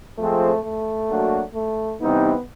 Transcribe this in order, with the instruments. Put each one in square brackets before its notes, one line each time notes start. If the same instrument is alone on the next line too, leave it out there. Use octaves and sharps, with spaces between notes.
[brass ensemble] F3 G#3 C4 [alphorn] A3
[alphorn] A3
[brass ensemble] F#3 A#3 D4 F#4
[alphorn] A3
[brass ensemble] C3 E3 G3 C4 D#4 [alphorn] B3